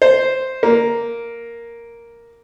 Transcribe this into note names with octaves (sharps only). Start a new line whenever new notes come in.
C5
A#3